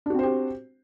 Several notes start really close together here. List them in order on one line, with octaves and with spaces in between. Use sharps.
D4 F#4 C4 C5 G4